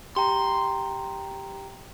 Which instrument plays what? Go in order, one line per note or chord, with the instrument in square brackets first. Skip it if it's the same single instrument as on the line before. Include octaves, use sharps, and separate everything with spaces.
[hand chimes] G4 G5 A#5 [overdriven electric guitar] C6